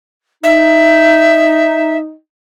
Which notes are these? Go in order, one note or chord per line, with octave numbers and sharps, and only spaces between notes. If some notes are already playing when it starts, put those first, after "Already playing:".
D#4 E5